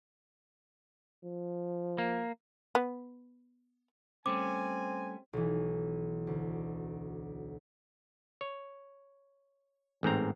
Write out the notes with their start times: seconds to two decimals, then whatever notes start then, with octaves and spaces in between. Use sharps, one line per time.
1.24 F3
1.98 A#3
2.75 B3
4.26 G3 A3 C4 C#4 G#5 D6
5.33 B1 E3
6.27 D2
8.41 C#5
10.03 A1 G#2 C4 A#5